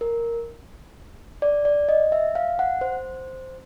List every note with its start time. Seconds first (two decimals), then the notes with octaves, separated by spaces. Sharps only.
0.01 A#4
1.42 D5
1.65 D5
1.89 D#5
2.12 E5
2.35 F5
2.59 F#5
2.81 C5